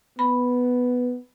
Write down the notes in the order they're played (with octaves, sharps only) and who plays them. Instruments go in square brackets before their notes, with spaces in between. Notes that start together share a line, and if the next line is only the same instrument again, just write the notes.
[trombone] B3 [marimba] B5